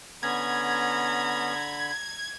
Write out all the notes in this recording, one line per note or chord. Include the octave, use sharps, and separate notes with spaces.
D3 B3 C#4 A#5 B5 G#6